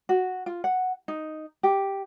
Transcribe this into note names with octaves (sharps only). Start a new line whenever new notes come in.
F#4
F4
F#5
D#4
G4